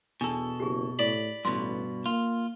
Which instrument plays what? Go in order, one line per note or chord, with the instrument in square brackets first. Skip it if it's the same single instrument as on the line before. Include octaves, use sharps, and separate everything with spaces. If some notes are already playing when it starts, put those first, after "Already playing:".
[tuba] E2 [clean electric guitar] B2 A4 [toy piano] D4
[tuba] F#1 [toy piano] G4 G#4
[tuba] A2 [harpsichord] D5 B5
[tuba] A1 [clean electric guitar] G2 B2 [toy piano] C6
[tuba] A#3 [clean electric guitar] F4